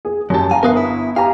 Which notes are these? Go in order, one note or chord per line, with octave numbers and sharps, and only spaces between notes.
G#4
F#2 F#3 G4 A5
F5 G#5 A#5
G1 A#4 B4 F5 D#6
E4
G4 F5 G#5 A#5